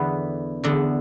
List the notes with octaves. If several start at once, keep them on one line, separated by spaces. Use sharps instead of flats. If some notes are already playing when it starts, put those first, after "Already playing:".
Already playing: E2 D3 B3 B4
E2 D3 B3